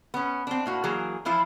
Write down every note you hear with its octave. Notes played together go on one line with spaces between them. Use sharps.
B3 C#4
C4 D4
A2 A#3 F#4
E3 F#3 A#3 G#4 A#5
E3 F3 E4 F4